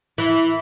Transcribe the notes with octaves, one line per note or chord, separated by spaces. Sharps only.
E3